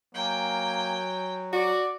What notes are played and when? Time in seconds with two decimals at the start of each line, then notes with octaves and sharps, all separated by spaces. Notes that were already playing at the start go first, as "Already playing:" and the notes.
0.15 F#3 A#3 G5 G#5
1.53 F#4 D5